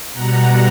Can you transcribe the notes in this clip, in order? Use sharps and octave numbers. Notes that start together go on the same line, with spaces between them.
B2 G3 F#5 A#5